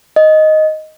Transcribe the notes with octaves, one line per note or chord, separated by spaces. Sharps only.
D#5